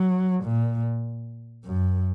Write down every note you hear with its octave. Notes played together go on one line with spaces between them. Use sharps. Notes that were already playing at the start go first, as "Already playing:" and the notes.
Already playing: F#3
A#2
F#2